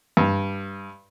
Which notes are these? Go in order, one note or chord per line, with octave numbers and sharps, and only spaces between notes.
G2